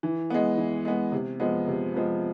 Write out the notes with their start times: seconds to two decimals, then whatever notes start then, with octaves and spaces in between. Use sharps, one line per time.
0.03 E3
0.30 G#3 B3
0.57 E3
0.85 G#3 B3
1.12 C3
1.40 F3 G#3 B3
1.68 C3
1.94 F3 G#3 B3